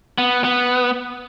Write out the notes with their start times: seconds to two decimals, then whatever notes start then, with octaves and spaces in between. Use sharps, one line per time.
0.18 B3
0.44 B3